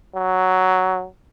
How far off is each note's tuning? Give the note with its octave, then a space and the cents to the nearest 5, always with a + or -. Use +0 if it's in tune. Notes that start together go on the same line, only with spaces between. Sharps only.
F#3 +5